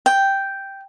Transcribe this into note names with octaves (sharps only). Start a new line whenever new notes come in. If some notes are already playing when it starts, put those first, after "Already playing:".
G5